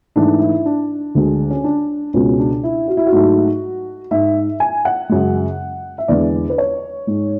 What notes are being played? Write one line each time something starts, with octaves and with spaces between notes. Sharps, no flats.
G#2 E3 A3 D4
E4
D4
D2 D3 G#3
C#4
D4
C#2 B2 G#3 C#4
D4
E4
F#4
E4
F#4
G#2 F#3 A3
G#2 G#3 E5
G#5
F#5
F#2 C#3 G#3
E5
E2 D3 G#3 D5
B4
C#5
G#2 G#3